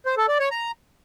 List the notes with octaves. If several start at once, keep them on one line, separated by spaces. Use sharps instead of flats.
C5
A4
D5
C#5
A#5